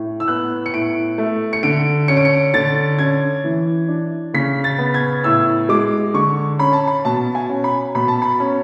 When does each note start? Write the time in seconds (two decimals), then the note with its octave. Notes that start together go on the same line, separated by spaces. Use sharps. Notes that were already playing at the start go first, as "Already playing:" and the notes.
Already playing: A2
0.20 E6
0.28 B3 F#6
0.66 C#7
0.73 A2 D7
1.18 A3
1.53 C#7
1.63 D3 D7
2.08 C#4 C#7
2.17 D7
2.25 C#7
2.54 D3 A6
2.99 C#4 G#6
3.44 E3
3.88 D4
4.34 C#3 B6
4.64 A6
4.78 B3
4.94 G#6
5.24 A2 E6
5.69 G#3 D6
6.14 D3 C#6
6.59 C#4 B5
6.73 A5
6.87 B5
7.05 B2 A5
7.35 G#5
7.49 C#4
7.64 B5
7.95 B2 B5
8.08 A5
8.22 B5
8.40 C#4